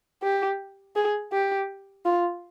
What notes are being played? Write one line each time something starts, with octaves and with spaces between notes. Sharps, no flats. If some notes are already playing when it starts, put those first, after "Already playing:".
G4
G#4
G4
F4